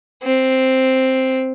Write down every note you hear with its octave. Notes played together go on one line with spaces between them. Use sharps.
C4